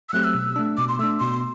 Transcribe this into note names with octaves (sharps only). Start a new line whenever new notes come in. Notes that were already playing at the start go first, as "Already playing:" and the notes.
E6
F#3 A3 C4 G4 F#6
E6
B2
A3 D4
B2 D6
C6
A3 D4 E6
B2 C6